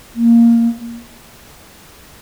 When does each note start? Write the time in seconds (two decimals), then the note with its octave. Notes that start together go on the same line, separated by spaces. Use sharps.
0.15 A#3